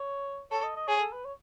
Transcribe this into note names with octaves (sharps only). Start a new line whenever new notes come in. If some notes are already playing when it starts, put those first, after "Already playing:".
Already playing: C#5
A4 C#5
D#5
D#5
G#4 C#5
A4
B4
C#5